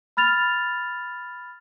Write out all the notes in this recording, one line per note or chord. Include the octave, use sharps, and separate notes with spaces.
B5 F6 A6 F7